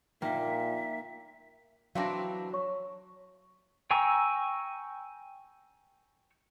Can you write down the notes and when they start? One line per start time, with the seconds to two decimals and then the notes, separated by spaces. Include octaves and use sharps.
0.22 A#2 A#3 D#4 E5 G5
1.95 E3 F#3 C4 D4 F5 A#6
2.53 C#5 C#6
3.91 G5 G#5 A#5 C#6 E6